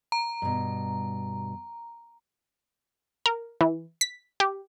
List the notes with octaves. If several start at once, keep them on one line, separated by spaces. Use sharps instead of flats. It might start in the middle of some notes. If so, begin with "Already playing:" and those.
A#5
G2 B2
A#4
E3
B6
G4